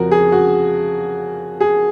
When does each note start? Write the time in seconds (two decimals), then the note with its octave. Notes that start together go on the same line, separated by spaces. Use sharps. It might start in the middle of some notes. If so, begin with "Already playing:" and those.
Already playing: F2 C#3 F3 F#4 A#4
0.11 G#4
0.32 F#4
1.60 G#4